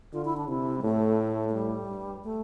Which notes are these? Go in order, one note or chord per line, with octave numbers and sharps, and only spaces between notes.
D3 F4
E4
D4
C3 E4
G3
A2 A3
A3
G3
G2
A3